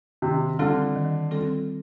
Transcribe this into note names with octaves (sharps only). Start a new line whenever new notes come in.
C3 D#3
D3 G3 C4 F4 A4
D#3
G3 C4 F4 A4